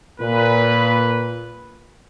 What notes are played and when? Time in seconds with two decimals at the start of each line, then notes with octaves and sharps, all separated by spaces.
0.20 A#2 B4